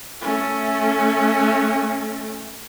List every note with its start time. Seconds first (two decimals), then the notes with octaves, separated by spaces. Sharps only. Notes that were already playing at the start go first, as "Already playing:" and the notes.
0.21 A3 C#4